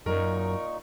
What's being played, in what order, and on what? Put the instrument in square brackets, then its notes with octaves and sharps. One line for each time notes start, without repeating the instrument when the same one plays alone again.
[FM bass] F#2 [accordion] A#2 D#4 C#6 [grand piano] A#4